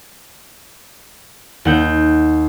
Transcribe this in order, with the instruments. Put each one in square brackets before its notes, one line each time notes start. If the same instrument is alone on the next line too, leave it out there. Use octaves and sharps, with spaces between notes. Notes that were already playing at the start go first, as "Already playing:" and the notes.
[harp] D#2 F#5 G6